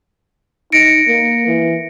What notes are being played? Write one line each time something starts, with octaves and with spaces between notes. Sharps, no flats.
D#4 A#6 C#7 D7
A#3
E3